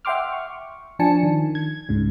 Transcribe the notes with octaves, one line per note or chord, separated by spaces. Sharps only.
E5 F#5 G5 C6 D6 F6
C#6
F3 D4 G#5 A5 C#7
D#3
G#6
C#2 G#2 C#3